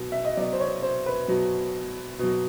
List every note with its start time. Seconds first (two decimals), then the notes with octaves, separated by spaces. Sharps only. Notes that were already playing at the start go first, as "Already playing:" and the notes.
Already playing: B2 F#3
0.12 E5
0.25 D#5
0.37 B2 F#3 D5
0.53 C5
0.60 C#5
0.82 C5
1.06 B4
1.28 B2 F#3
2.19 B2 F#3